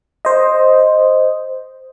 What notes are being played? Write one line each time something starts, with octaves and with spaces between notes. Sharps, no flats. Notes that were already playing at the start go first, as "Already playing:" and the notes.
C5 D#5